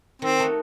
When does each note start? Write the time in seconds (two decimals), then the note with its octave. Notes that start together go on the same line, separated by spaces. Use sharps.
0.22 D#3 C4
0.39 A3 D#4 F#4